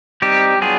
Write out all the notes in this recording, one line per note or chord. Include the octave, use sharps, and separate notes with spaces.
G3 C4 D#4 G4
F#3 B3 D4 F4 G#4